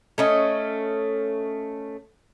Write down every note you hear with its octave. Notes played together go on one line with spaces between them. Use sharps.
A3 C#4 D#5